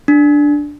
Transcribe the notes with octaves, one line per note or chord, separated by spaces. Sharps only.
D4